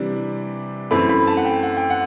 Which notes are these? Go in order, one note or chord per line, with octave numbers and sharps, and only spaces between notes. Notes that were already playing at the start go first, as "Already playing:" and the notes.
Already playing: C3 E3 G3 D4
F#2 E3 A3 C4 B5
B5
A5
F#5
G5
F#5
G5
F#5